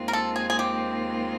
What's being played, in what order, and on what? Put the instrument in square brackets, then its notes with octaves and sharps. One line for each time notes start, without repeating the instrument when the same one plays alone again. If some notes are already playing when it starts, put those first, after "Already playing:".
Already playing: [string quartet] D#2 D#3 G#3 C4 F4
[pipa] A#4
A4
G#4
G#4
G4